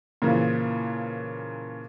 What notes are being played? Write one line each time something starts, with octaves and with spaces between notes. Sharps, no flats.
A#2 C#3 E3 F3